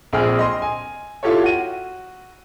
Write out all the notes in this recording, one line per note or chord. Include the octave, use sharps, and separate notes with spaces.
A#1 C4 G#4 G5 F6
D#5 C6
G#5
E4 F4 G4 A4 C#5
F#4 D#7